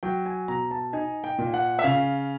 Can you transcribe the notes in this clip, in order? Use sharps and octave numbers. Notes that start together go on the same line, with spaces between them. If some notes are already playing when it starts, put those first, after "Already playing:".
F#3 G5
G#5
B2 A#5
A5
D#4 G#5
G5
A#2
F#5
E5
C#3 F5